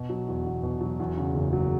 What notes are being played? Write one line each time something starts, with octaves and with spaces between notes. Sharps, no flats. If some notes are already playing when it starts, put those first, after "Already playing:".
Already playing: B2
F#3
E2
E2
B2
F#3
E2
C#3
F#1
F#3